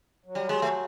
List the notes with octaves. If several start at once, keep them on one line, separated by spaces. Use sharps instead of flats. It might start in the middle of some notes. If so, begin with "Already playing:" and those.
F#3
G3
G#3
A3